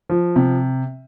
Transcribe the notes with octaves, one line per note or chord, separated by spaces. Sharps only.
F3
C3